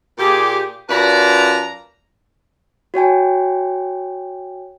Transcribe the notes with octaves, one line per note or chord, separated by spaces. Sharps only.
A#2 G4 G#4
F#2 F4 B4 D5 A5 A#5
F#4 C#5 G5 G#5